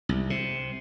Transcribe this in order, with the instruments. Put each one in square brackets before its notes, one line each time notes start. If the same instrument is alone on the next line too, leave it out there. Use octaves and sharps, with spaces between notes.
[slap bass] C2
C3